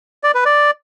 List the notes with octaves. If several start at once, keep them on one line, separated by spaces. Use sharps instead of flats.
D5
B4
D5